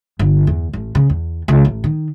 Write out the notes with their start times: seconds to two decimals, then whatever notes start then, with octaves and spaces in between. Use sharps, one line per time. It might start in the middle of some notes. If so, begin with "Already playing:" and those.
0.19 G1
0.47 E2
0.73 A1
0.95 C#3
1.10 E2
1.48 C#2
1.65 A1
1.84 D#3